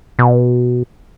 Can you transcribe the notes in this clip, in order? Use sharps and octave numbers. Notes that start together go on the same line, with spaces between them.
B2